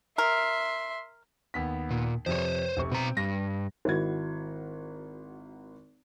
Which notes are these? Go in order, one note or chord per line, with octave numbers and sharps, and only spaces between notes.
A#4 E5 C6
D#2 B3 B6
A#2
F2 C3 C5 C#5
F1 C3 C#6
B2 C4 A#5
G2 A#6
G#1 E4 F#4 G#6